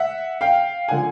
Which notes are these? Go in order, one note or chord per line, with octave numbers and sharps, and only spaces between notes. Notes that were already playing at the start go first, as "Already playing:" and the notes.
Already playing: E5 F#5
F5 G5
D3 F3 F#5 G#5